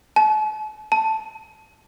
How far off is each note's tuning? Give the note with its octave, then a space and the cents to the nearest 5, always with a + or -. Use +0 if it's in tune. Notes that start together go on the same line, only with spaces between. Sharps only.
A5 -40
A5 +0